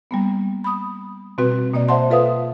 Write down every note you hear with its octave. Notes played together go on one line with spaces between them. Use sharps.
G3 A#3 B3
B5 D#6
B2 G3 C4 F#4 B4
B2 A#3 D5 D#5
C5 E5 F#5 A5 C6
F4 A4 B4 E5 F5 D#6